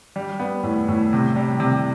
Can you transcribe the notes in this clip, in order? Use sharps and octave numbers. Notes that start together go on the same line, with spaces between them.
G3
B3
A2
A2
C3
G3
C3